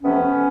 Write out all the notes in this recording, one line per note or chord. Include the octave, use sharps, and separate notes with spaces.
F2 C3 F3 A3 B3 C#4